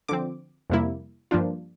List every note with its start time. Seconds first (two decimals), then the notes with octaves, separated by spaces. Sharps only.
0.09 D3 F3 C4 D6
0.70 F2 C3 G3 A#3 E4
1.31 G2 F3 A#3 D4 F4